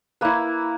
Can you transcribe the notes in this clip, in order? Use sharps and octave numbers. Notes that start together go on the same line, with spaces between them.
A#3 E4 B4